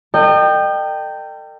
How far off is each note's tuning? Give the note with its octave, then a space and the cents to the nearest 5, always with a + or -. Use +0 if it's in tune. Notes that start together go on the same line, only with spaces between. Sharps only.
A4 +45 D#5 -35 G5 +0